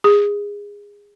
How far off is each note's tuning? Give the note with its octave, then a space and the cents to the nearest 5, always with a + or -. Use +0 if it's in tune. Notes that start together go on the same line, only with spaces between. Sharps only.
G#4 -25